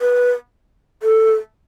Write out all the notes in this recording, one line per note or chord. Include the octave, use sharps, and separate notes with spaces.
B4
A4